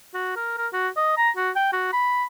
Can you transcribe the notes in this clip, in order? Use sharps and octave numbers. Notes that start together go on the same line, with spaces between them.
F#4
A#4
A#4
F#4
D#5
A#5
F#4
G5
F#4
B5